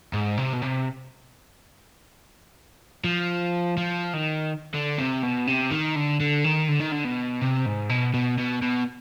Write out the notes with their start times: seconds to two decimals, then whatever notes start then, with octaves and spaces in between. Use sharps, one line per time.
0.13 G#2
0.38 C3
0.53 B2
0.62 C3
3.04 F3
3.77 F3
4.14 D#3
4.74 D3
4.99 C3
5.23 B2
5.47 C3
5.71 D#3
5.96 D3
6.20 D3
6.44 D#3
6.68 D3
6.80 D#3
6.92 D3
7.05 B2
7.41 C3
7.66 G#2
7.89 B2
8.14 B2
8.38 B2
8.62 B2